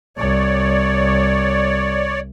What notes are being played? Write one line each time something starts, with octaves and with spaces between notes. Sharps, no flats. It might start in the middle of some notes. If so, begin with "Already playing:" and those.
C2 C#5 D5